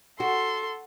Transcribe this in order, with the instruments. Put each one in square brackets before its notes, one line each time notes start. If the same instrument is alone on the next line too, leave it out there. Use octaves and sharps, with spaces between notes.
[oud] F#4 [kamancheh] A4 C6